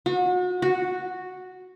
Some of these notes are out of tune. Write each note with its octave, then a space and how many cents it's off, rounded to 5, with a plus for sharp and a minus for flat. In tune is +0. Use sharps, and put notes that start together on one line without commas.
F#4 -35
F#4 -5